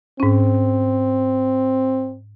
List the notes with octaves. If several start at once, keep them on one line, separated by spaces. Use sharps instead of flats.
G#2 C4 C#4